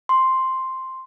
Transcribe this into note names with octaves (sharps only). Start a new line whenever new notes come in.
C6